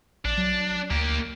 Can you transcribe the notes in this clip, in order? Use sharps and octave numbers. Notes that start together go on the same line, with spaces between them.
A#1 D4
F#3
D2 A#3 G4